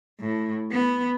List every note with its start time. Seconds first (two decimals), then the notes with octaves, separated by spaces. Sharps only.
0.20 A2
0.71 B3